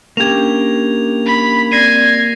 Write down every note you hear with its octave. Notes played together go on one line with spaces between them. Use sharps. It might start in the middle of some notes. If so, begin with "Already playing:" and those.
A#3 C#4 D4 G4 G#6 F7
B5
C4 D5 G#6 A#6 C7 D#7